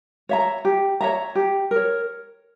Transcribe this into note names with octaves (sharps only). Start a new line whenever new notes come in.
C#5 E5 A#5
G4
C#5 E5 A#5
G4
A#4
C#5